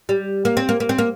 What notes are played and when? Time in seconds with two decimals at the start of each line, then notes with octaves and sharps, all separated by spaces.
0.09 G3
0.45 A#3
0.57 C4
0.69 A#3
0.80 A#3
0.89 C4
0.98 A#3